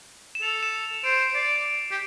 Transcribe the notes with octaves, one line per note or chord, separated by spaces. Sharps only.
E7
A4 F7
E7
E7
C5 D7
D5 C7
D7
G4